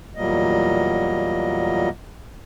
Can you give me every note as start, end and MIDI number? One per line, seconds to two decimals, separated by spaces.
0.16 1.89 40
0.16 1.89 46
0.16 1.89 54
0.16 1.89 55
0.16 1.89 58
0.16 1.89 75